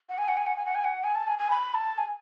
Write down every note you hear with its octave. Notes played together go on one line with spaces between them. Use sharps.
F#5
G#5
F#5
G#5
F#5
G#5
F#5
G#5
F#5
G#5
A5
G#5
G#5
B5
A5
G#5